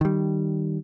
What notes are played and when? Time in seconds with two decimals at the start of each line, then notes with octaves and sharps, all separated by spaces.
0.01 D#3 G3